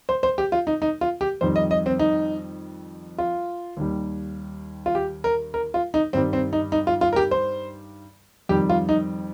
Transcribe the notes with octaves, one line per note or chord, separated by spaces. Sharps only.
C5
C5
G4
F4
D#4
D#4
F4
G4
F2 D#3 G3 C5
D#5
D#5
C4
D#4
F4
D#2 D#3 G3
F4
G4
A#4
A#4
F4
D#4
G2 D#3 G3 C4
C4
D#4
D#4
F4
F4
A#4
G4
C5
F2 D#3 G3 G4
F4
D#4